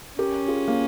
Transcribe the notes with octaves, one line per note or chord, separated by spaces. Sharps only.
C#4 G4 A#4
F4 G#4
A#3